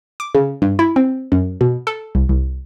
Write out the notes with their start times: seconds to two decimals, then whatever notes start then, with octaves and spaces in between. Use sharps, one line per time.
0.20 D6
0.35 C#3
0.62 G2
0.79 E4
0.96 C4
1.32 F#2
1.61 B2
1.87 A4
2.15 C2
2.29 C2